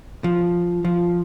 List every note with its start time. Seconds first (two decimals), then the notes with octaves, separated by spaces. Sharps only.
0.24 F3
0.85 F3